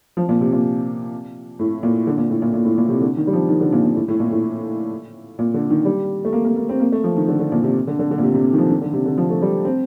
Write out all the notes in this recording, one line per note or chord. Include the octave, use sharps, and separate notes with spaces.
F3
A#2
C3
A#2
A2
A#2
D3
A#2
A2
A#2
A#2
A2
A#2
C3
D3
D#3
G3
F3
D#3
D3
A#2
A#2
A2
A2
A#2
A2
A#2
D3
D#3
G3
A3
A#3
A#3
A#3
C4
A#3
A3
F3
D#3
D3
D3
A#2
C3
D3
D3
D3
A#2
C3
C3
D#3
F3
D#3
D3
C3
D3
F3
A3
G3
C4